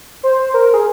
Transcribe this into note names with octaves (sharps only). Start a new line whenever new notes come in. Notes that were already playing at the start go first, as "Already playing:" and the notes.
C5
C5
A#4
A#4
G#4